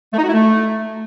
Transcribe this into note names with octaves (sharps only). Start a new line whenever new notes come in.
A3
D#4
F#4
E4
A3